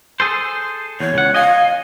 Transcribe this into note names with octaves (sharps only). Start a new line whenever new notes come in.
G#4 A4 C5
E2 C#5
C#2 F#5
D#5 F5 G#5